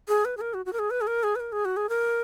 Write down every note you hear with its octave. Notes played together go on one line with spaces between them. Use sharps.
G#4
B4
G#4
A#4
F#4
F#4
A#4
G#4
B4
G#4
A#4
G#4
B4
A#4
G#4
F#4
G#4
A#4